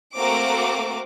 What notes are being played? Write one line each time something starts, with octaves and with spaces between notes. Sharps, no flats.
A3 A#3 C4 F#4 A#4 D6